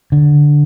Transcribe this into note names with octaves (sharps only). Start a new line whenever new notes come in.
D3